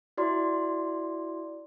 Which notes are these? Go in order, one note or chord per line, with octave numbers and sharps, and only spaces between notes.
E4 F#4 D5 C6